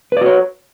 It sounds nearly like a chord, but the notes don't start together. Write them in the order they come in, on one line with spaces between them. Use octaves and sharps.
B4 D5 F#4 C#5